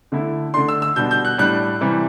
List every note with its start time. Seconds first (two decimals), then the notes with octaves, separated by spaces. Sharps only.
0.12 D3 A3 E4
0.54 D3 A3 D4 C6
0.68 E6
0.82 E6
0.96 B2 G3 D4 G6
1.11 G6
1.25 F#6
1.38 A2 G3 D4 F#6
1.81 C3 E3 G3